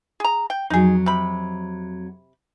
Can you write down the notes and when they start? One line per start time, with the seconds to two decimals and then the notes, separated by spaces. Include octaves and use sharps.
0.20 G#4 A#5
0.50 G5
0.70 F2 F#3 D#4 G#4
1.06 C3 B5